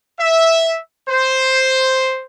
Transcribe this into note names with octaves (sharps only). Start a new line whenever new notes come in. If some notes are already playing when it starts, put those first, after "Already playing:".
E5
C5